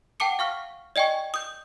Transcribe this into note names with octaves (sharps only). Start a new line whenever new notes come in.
F#5 G5 A5 D6 C#7
F5 C#6 F6 B6
D5 D#5 G5 G#5 C#6
D#6 G6